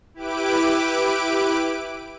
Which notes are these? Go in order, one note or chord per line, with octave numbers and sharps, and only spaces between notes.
E4 G4 B4 D6 D7